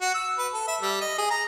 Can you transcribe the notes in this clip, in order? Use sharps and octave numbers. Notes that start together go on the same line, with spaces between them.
F#4
E6
B4
A4
E5
G3
D#5
G#4
A#5